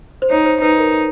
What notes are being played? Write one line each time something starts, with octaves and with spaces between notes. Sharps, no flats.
C5
D#4 C#5
C5
D#4 B4
A#4